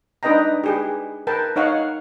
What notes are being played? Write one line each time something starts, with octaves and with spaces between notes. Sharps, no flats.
D4 D#4 B4 D#5 G5 A#5
G4 G#4 B4
A#4 B4 G5 A5
D#4 C#5 F5 F#5